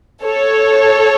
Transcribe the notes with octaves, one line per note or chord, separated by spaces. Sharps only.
A4 C#5